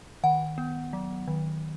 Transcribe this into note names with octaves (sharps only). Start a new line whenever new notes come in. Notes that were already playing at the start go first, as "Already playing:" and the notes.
D#3 F#5
B3
F#3
D#3